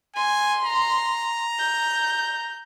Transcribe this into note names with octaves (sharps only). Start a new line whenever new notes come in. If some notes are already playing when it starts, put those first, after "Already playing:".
G#5 C6
A#5
G6